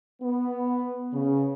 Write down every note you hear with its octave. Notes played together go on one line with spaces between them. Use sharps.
B3
C#3